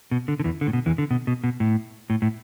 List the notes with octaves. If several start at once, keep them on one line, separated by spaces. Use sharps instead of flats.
B2
D3
D3
E2 E3
D3
A2
B2
E2 E3
D3
B2
B2
B2
A2
A2
A2